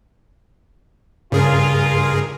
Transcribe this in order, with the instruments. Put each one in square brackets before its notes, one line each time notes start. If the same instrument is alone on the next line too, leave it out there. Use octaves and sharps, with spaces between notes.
[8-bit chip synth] G2 G#4 A#4 [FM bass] C#3 [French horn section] F4